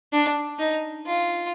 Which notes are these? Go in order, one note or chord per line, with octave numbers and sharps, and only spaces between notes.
D4
D#4
F4